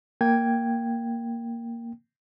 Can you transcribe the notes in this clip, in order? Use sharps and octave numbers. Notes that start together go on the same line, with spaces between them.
A#3 G5 G#6